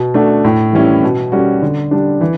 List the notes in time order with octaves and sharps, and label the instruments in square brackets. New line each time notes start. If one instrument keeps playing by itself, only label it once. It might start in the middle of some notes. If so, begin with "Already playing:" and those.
Already playing: [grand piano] B2
A3 D4 F#4
A2
E3 G3 C#4 E4
B2
G3 C#4 F#4
D3
G3 D4
E3